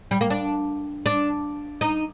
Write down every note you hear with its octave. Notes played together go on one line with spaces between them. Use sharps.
G3
A#3
D4
D4
D#4